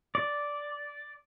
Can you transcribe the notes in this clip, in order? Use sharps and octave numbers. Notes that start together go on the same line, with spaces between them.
D5